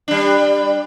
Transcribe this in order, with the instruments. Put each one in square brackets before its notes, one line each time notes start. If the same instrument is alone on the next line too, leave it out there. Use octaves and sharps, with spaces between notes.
[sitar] G3 D4